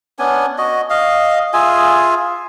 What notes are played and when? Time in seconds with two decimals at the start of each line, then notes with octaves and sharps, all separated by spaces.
0.19 B3 C#4 D4 G#5
0.58 F#4 D#5
0.90 D#5 F5
1.53 F4 G#4 E5 G#5